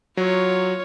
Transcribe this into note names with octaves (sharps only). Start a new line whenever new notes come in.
F#3 F4 C#5